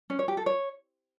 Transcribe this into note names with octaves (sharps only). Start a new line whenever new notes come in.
C#4
C#5
G4
A4
C#5